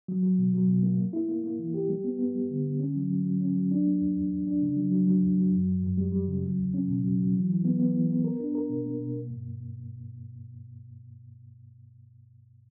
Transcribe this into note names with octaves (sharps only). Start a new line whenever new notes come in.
F#3
F#3
B2
F#3
B2
A#3
A#3
E4
A#3
A#3
E3
G4
G3
B3
B3
G3
D3
D3
C#4
F#3
F#3
F#3
C#4
F#3
D4
A#3
E2
E2
E2
D4
C#3
F#3
F#3
F#3
E2
F#3
F#2
F#2
F#2
G3
G3
C#3
F#3
E2
C#4
B2
F#3
F#3
E3
E3
B3
B3
E3
B3
A#4
D4
A#4
B2
A#3
B2
A#3
G2